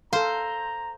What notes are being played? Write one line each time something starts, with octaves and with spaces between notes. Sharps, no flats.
A4 C5 F5 A#5